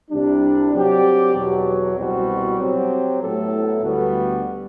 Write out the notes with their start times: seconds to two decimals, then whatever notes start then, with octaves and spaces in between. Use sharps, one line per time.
0.10 C2 C3 G3 D4
0.73 F#3 C4 G4 D5
1.34 E2 B2 F#3
1.97 C2 B2 G3 C4 F#4
2.59 F#3 C4 G4
3.21 A2 F#3 B3 E4 A4
3.82 D2 D3 G3 B3 F#4